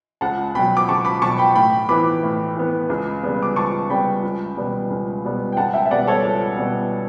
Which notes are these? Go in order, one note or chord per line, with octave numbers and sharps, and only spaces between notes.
C#2 F#5 A5
B2 F#3 G5 B5
D6
C#2 A5 C#6
B5 D6
B2 F#3 A5 C#6
G5 B5
A2 G5 B5
E3 B3 B5 D6
A2
E3 B3
C#2
C#3 G3 B3
D6
C#2 A5 C#6
C#3 G3 B3 G5 B5
C#2
B2 G3 B3
C#2
B2 G3 B3
G5
C#2 F#5 A5
E5 G5
E5
B2 G3 B3 D5 F#5
A4 C#5
C#2
B2 G3 B3